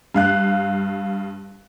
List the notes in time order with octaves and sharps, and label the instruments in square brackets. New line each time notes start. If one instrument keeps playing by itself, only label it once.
[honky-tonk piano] G2 F5 F#6